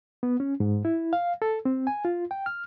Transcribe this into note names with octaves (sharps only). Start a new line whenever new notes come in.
B3
C#4
G#2
E4
F5
A4
C4
G#5
F4
G5
F6